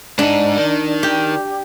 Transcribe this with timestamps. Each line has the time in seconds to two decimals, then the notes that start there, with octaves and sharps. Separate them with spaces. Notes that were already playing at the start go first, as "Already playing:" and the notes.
0.19 G#2 D4 D#4
0.57 D#3
1.03 G4